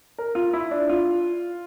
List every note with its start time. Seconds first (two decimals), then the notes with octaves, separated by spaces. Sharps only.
0.18 A#4
0.35 F4
0.53 E4
0.71 D4
0.89 F4